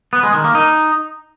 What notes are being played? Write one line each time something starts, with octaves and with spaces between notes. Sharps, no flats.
B3
G#3
D#3
A#3
D#4